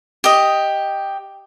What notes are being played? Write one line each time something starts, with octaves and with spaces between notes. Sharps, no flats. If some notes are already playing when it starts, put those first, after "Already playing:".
G4 D#5